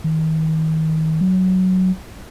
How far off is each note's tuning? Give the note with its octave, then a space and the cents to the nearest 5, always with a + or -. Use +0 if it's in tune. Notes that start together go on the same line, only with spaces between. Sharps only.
D#3 +35
F#3 +5